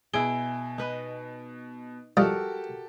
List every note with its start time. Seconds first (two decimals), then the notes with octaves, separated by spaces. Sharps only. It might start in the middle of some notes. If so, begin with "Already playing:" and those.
0.13 B2 E4 G#4 D7 G7
0.78 D#4 B4 D#5
2.17 F3 G3 F#4 G4 A4 A#4 D#5